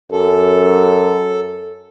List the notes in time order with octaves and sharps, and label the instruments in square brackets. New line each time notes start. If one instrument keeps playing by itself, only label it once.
[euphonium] F#2 [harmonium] A4